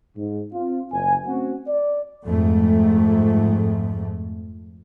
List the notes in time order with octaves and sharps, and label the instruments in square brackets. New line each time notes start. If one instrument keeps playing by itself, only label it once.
[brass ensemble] G#2
C4 F4
F#1 G#5
A3 C4 C#4 F#4
D5
[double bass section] F2 G#2 A3